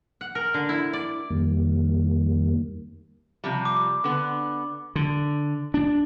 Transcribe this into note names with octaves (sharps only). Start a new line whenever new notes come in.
F#5
A#4
D3
E4
D5
F2 D#3 G3 A#3
C3 F3 G3
D6
D3 B3
D3
D4